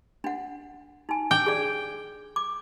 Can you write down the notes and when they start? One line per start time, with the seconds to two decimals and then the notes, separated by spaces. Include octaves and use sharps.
0.24 D4 F#5
1.09 D#4 G#5
1.31 D4 G5 D6
1.46 G#4 D5
2.36 D6